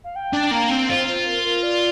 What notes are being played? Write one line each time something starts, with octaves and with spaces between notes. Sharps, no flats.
F5
G5
D4
A#3 F5
C4
F4 C5
C5
A#4
A#4
D5